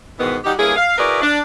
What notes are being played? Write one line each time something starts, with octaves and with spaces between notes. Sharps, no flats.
G#2 B2 D#3 E3 B3
G3 D#4 F#4 G4
G2 A#3 C#4 E4 G#4
F5
E4 F#4 G#4 A#4 B4 D5
D4